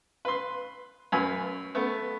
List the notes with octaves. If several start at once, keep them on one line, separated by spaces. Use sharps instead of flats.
B4 C6
F#2 B4 G#5
A3 B3